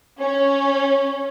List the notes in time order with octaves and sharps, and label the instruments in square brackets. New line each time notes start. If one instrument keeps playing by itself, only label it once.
[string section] C#4